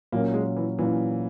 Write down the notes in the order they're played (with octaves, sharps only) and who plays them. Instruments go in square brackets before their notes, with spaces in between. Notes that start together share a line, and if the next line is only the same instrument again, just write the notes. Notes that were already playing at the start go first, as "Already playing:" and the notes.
[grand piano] A#2 F#3 C#4 [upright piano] A#3
[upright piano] G#3
E3
[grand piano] A#2 F#3 C#4 [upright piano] E3